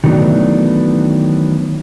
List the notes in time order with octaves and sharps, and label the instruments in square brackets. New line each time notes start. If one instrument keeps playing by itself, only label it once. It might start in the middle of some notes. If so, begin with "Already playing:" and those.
[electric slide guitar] D#3 E3 F#3 A3 B3 D4